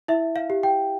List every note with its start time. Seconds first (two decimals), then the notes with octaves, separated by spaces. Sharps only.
0.08 E4 E5
0.36 F5
0.50 G4
0.63 G5